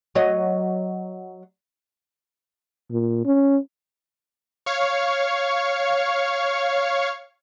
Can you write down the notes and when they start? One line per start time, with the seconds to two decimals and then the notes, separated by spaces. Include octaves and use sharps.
0.15 F#3 C#5 D#5
2.91 A#2
3.25 C#4
4.66 C#5 F5 C#6